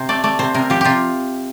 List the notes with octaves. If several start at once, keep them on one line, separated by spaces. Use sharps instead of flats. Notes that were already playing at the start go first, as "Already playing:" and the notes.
Already playing: C3 C5
A3 D5
A3 D5
C3 C5
C3 A#4
F3 G4
C3 F4 G4